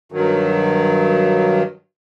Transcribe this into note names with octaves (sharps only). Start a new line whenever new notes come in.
G2 D#3 F#3